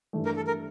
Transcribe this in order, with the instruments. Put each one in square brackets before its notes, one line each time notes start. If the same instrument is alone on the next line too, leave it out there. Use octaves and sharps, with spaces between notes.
[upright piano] G2 E3 A3
[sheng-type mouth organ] A#4
A4
A#4